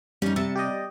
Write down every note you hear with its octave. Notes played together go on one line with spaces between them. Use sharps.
G3 C#4 D#4
C3 E5 A6 C#7
G4 D5 D#5